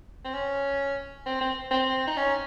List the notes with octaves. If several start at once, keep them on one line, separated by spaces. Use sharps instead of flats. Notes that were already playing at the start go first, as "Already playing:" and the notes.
C4
C#4
C4
C4
C4
D#4
C#4